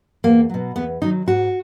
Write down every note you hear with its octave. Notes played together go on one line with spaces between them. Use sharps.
E2 A#3
B2 F#3
E2 B3
D#3 F#3 D#4
G#2 F#4